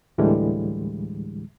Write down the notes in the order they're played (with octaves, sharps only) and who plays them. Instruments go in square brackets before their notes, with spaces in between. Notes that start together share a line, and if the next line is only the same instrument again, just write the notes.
[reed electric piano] D2 A2 D3 E3 G3 G#3